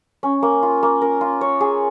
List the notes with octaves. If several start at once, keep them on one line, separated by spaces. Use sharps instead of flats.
C#4
A#3
F4
A#3
A#4
F4
C#5
G#4